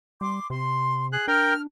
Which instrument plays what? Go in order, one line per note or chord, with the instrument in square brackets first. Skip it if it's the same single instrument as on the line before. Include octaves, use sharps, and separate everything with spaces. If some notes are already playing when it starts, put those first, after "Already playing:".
[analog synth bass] G3 [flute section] C6 D6
[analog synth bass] C3 [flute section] C6
[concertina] G#4 F#6
[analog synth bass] D4 [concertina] A#4 G5 [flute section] F6